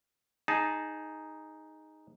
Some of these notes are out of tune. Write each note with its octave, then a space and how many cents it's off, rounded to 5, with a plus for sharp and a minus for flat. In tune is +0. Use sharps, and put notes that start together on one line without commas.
D#4 +0 G#4 +0 A5 -20